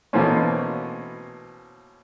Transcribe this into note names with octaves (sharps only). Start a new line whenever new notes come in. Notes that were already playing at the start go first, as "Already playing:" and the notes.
B2 E3 A3 A#3 C4 C#4